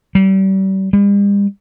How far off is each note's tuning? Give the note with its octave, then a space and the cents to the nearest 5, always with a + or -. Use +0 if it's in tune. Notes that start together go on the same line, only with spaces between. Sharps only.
G3 -35
G3 +45